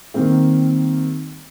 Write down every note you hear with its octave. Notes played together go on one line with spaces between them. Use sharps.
D#3 G3 A#3 C4